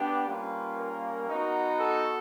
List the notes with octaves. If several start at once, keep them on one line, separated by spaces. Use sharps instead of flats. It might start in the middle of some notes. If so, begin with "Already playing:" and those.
Already playing: B3 D4 G4
G3 A#3 C#4 F4 B4
A#4
B3 D#4 F#4
A4